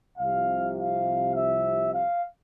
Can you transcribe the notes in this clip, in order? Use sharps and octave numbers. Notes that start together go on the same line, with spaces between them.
C2 C3 F3 F5
F5
E5
F5